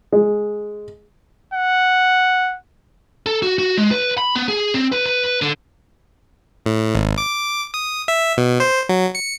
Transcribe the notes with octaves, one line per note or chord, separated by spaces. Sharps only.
G#3
F#5
A4
F#4
F#4
G#3
B4
B5
B3
G#4
C4
B4
B4
D3
A2
G#1
D6
D#6
E5
B2
C5
F#3
C#7